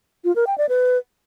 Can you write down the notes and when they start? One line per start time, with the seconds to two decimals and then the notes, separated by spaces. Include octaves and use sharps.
0.24 F4
0.36 A#4
0.47 G5
0.58 D5
0.69 B4